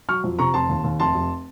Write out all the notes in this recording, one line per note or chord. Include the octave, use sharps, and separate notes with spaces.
F#3 C#6 F6
F2
C3 A#5 C#6
F1 A5 C6
D#2
D#2
F1 A5 C6
F1